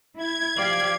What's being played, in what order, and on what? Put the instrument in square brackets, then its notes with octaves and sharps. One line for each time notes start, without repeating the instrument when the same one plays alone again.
[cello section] E4 [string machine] G#6
[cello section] F3 G4 F5 [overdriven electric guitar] D5